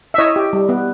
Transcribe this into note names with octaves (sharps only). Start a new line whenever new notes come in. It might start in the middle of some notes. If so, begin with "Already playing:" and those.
E5
E4 C#5 D#5
G4
G3
B3